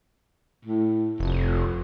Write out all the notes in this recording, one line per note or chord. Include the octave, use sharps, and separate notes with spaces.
A2
F1 F2